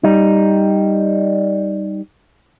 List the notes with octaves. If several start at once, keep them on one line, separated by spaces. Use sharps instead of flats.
G3 D#4